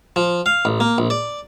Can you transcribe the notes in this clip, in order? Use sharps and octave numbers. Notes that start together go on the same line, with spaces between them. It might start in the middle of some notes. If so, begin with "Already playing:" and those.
F3
F5
A1
A#3
A#1
D5